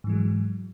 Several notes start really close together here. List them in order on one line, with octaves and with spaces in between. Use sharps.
G#2 E3 G#3 F#3